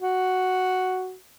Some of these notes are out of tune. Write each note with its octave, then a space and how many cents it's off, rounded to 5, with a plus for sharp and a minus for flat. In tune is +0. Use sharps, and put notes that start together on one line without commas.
F#4 +0